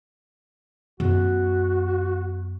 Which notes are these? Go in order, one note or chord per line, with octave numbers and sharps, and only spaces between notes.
F#2 B3 F#4